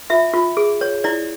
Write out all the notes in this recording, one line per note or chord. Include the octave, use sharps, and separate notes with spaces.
F4 E5
F4
G#4
C#5
E4 D5